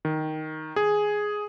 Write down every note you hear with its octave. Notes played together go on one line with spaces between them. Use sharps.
D#3
G#4